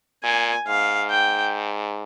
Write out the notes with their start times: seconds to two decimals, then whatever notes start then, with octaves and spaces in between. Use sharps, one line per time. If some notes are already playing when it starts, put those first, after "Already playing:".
0.24 A#2 G#5
0.67 G#2 F5
1.11 G5